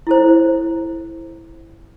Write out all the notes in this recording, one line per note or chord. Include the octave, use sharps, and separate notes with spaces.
E4 A4 C5